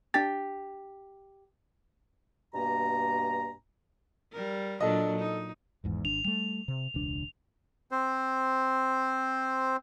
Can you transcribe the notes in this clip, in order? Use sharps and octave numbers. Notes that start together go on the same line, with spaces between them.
D4 G4 A6
G2 B2 A#3 G#5 A#5
G3 A#4
A#2 F#3 D4 A4 D#5
D#4
G#1 E2 G#2
G#1 D4 F7
G3 A3 F7
C3
E1 C#2 D4
C4 C5